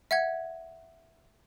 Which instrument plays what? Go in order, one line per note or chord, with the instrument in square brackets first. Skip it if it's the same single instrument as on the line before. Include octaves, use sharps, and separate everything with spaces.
[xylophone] E5 F#5 G#6